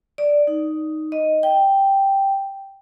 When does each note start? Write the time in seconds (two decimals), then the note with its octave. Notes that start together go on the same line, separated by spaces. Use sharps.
0.18 D5
0.47 D#4
1.12 D#5
1.43 G5